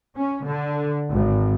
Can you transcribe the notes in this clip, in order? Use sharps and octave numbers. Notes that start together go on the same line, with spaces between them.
C#4
D3
G#1